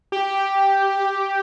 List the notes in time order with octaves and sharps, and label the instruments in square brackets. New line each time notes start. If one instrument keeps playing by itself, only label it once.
[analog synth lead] G4